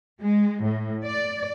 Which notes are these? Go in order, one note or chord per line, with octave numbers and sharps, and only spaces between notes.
G#3
A2
D5